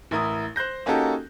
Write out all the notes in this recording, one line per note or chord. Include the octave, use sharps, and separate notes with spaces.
A1 E4 A#4 D#6
C5 F#6 G6 A#6
A#3 C#4 D#4 F#4 G4 A4